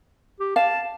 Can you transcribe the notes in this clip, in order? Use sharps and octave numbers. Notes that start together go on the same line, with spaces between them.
G4
F5 A5